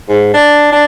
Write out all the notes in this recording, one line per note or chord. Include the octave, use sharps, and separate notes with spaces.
G#2
D4
D4